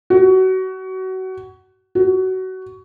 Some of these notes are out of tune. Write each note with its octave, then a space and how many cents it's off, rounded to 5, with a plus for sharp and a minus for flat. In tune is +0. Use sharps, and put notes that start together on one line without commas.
F#4 +25
F#4 +20